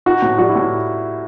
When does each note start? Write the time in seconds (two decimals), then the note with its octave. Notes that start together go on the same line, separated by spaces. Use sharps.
0.06 D#4 F#4
0.22 A2
0.38 G3 F#4
0.49 E4
0.56 A2